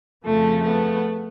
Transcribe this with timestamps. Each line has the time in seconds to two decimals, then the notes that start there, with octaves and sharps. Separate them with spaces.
0.24 F2 C#3 F3 A3
0.63 A3 B3